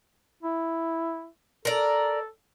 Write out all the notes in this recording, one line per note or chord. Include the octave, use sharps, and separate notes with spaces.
E4
A4 A#4 D5